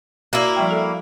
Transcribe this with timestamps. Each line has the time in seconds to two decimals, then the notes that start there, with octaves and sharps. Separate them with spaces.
0.33 A#3 E4 F#4
0.56 F3 G3 G5
0.71 A4